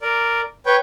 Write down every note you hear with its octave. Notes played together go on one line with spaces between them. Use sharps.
A#4 D5
B4 C#5 G5